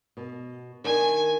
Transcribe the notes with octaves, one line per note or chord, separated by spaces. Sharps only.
B2
D#3 D4 G#5